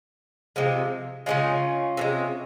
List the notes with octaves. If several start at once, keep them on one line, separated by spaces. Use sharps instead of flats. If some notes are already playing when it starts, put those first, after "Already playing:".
C3 F3 G#3
C#3 E3 G#3 C#4 F4
C3 E3 G#3